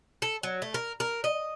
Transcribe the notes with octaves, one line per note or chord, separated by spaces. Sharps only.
A4
F#3
A3
A#4
A#4
D#5